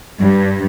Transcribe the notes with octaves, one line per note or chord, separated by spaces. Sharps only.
G2